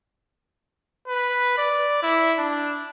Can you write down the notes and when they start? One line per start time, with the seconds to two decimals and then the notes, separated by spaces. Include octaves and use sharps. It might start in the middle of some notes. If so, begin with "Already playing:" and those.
1.08 B4
1.58 D5
2.03 E4
2.38 D4